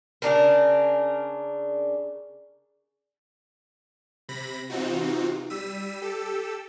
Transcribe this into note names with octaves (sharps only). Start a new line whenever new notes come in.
C#3 D4 A#4
C3 B5 A#6
C3 E3 C4 D#4 F4 F#4
G3 E6 B6 D#7
G4 A4 E6